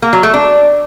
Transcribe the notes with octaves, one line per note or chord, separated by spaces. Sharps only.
A#3
F#3
A3
D4